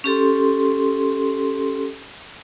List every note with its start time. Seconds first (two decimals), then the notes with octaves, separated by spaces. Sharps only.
0.04 C#4 G4 A4 C6